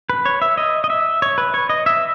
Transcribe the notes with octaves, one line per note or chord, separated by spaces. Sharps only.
B4
C#5
E5
D#5
D#5
E5
C#5
B4
C#5
D#5
E5